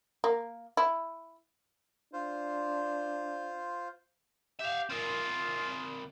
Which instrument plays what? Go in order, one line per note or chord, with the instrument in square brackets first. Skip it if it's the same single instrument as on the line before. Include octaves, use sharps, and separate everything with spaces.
[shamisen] A#3
E4
[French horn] D4 [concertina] F4 C5
[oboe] G4 [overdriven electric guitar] E5 F5
[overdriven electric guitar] C4 A#4 [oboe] F4